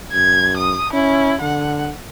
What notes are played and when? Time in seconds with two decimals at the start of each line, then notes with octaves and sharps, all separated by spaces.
0.12 F#2 G#6
0.57 D#6
0.93 C#4 E4
1.42 D3 F#5